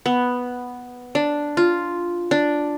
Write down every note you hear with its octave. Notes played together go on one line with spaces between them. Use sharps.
B3
D4
F4
D4